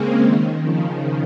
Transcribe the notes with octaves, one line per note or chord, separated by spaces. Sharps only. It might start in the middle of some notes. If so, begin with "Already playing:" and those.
Already playing: C#3 G#3 A#3 C4 C#4
D#3
C#3 F3